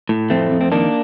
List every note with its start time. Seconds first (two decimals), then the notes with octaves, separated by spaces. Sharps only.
0.09 A2
0.30 F2 A3 C4
0.51 F2
0.61 C4
0.72 D#3 A#3 D4